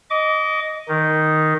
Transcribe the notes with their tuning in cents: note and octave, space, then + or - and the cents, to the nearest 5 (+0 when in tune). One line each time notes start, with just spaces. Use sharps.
D#5 +0 D6 -35
D#3 +0 D#4 +0